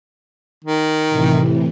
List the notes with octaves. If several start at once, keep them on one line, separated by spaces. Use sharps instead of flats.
D#3
A2 C3 E3